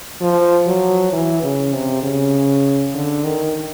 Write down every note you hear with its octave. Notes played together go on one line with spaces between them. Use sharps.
F3
F#3
E3
C#3
C3
C#3
D3
D#3